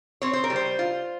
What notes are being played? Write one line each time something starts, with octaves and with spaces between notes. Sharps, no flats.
C4 C#5
C5
A#4
G3
C5
F4